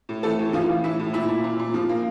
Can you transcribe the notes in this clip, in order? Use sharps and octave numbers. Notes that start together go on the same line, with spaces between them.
A2
E3 A3 A4
A2
E3 F3 F4
E3
A2 E4
A2
A#2 E4
A#2
A#2
A#2
F3
A#3